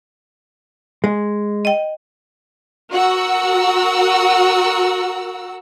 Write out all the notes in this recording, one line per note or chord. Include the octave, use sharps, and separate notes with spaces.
G#3
D#5 G5
F#4 A#4 F#5 E6